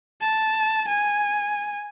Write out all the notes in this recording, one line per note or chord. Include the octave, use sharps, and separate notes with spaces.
A5
G#5